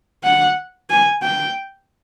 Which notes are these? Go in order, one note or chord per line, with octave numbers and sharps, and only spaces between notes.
F#5
G#5
G5